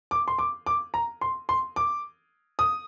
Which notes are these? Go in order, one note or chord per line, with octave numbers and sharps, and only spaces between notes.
D6
C6
D6
D6
A#5
C6
C6
D6
D#6